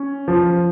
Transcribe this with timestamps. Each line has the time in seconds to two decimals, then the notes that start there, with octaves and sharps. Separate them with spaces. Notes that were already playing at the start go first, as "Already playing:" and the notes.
Already playing: C#4
0.28 F3